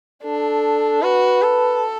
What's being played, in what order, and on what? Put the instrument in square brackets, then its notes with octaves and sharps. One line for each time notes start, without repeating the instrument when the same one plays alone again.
[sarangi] D4 [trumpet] A4
[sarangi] F#4 [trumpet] B4
[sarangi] A4